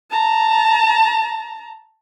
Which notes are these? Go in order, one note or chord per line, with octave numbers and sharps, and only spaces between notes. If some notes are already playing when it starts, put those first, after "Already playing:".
A5 A#5